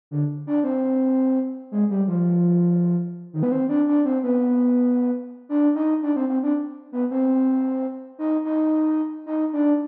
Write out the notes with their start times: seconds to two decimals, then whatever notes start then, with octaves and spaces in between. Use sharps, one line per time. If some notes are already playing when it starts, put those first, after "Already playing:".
0.11 D3
0.47 D4
0.64 C4
1.71 G#3
1.90 G3
2.08 F3
3.33 D#3
3.43 B3
3.52 C4
3.69 D4
3.88 D4
4.05 C4
4.23 B3
5.49 D4
5.75 D#4
6.03 D4
6.16 C4
6.29 C4
6.43 D4
6.92 B3
7.11 C4
8.18 D#4
8.45 D#4
9.26 D#4
9.53 D4